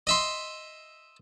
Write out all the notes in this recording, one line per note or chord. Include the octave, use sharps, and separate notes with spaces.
D#5 E5 C6